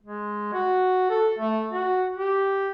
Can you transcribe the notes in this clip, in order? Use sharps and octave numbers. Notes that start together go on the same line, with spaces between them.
G#3
F#4
A4
A3
F#4
G4